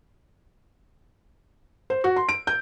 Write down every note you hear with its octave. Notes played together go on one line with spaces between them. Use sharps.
C5
F#4
C6
D7
G6